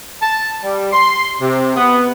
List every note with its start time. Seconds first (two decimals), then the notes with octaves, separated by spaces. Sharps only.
0.21 A5
0.62 G3
0.93 C6
1.41 C3
1.77 B3